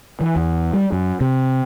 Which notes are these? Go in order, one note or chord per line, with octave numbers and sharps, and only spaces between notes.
E3
E2
G3
F#2
C3